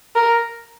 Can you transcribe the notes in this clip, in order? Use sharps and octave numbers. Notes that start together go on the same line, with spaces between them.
A#4